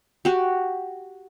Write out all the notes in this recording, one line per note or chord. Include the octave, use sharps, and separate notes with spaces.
F#4 G4